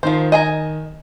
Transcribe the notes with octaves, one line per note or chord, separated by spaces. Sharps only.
D#3 F3 C5
D#5 G#5 A#5